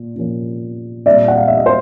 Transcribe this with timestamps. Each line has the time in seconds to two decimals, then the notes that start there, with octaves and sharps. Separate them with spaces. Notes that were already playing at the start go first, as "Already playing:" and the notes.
Already playing: A#2
0.16 A#2 F3 A#3 C#4
1.06 A#2 G3 C4 D5 E5
1.28 F#5
1.38 F5
1.48 E5
1.57 D#5
1.66 C5